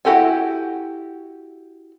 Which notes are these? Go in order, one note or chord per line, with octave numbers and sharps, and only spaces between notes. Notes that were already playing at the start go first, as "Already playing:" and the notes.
E4 F#4 G4 A4 G#5